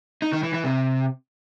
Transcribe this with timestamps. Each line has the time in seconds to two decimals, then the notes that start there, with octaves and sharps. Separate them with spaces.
0.22 D#4
0.33 D#3
0.43 E3
0.54 E3
0.64 C3